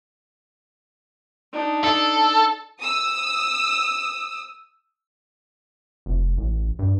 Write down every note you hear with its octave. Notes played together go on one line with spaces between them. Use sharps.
D4 D#4
A4
D#6 E6
F1
A1
G2